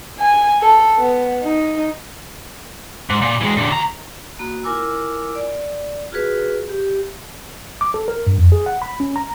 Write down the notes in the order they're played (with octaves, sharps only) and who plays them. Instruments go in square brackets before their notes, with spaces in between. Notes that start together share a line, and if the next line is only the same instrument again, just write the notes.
[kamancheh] G#5
A4
B3
D#4
[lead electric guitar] G#2
A#2
E3 G#3
A#2 D3
D2 A#5
[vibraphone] A#3 F#4 B5
E4 F4 A#4 G#5 D6 E6
D5
F4 F#4 G#4 B4
G4
[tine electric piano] D6
A4
A#4
G2
F2
G#4
F#5
B5
C#4
A#5